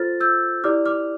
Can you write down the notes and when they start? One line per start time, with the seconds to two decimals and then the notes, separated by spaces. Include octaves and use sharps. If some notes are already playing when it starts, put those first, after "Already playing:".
Already playing: F4 A4 C5 F6 A6
0.20 E6 G6
0.64 E4 G4 D5 D6 F6
0.86 D6 F6